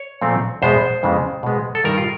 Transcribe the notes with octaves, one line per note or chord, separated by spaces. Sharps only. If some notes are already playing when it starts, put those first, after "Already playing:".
Already playing: C#5
A#2 F3 A3 C4
E2 B2 G#3 B3 C5
F2 C#3 E3 G#3 B3
B2 G#3 B3
A4
G2 D#3 G3 A#4
F4